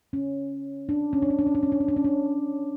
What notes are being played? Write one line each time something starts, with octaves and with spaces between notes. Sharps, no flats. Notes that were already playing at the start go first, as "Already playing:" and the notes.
C#4
D4
C#4
D4
C#4
D4
C#4
D4
C#4
D4
C#4
D4
C#4
D4